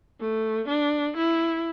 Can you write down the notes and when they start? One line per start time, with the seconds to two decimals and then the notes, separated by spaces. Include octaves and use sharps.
0.20 A3
0.68 D4
1.17 E4